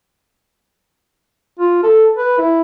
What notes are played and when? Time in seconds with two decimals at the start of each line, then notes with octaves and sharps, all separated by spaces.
1.59 F4
1.83 A4
2.17 B4
2.38 E4